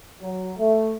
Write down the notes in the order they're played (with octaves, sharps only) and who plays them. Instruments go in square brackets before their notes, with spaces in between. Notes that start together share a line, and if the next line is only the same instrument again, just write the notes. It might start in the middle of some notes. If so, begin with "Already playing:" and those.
[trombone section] F#3
A3